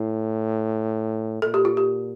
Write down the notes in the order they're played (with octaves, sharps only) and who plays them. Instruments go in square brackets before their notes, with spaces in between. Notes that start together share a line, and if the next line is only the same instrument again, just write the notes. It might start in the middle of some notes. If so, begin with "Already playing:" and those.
Already playing: [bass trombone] A2 [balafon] E4
[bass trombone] A#2 [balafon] A4
[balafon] G4
F4
G4